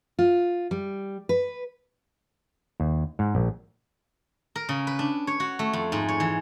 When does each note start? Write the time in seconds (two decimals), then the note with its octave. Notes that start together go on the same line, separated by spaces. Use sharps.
0.19 F4
0.71 G3
1.29 B4
2.80 D#2
3.19 G#2
3.35 A#1
4.55 A#4
4.69 C#3
4.87 B4
4.99 D4
5.27 C#5
5.40 F#4
5.59 A3
5.73 F2
5.92 G#2
6.09 C#5
6.20 E3